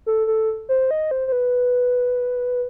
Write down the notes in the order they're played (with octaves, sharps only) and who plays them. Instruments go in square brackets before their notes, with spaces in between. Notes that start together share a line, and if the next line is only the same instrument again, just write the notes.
[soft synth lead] A4
A4
C5
D#5
C5
C5
B4